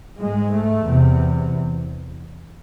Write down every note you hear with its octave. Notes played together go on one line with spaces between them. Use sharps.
G#2 G#3
A3
E2 C3